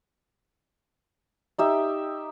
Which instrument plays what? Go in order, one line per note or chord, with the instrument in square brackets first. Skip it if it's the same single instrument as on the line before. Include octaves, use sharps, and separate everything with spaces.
[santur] D#4 G4 E5